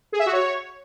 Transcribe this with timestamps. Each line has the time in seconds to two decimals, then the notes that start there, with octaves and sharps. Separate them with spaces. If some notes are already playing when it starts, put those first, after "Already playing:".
0.12 G#4
0.19 E5
0.26 F#4
0.33 C#5